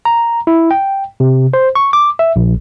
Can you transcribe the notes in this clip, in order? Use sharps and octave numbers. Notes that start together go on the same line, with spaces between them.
A#5
E4
G5
C3
C5
C#6
D6
E5
A#1